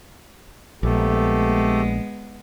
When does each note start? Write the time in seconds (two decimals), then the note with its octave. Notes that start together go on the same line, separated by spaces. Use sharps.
0.83 A#1 G#3 A3 B3 G4 A4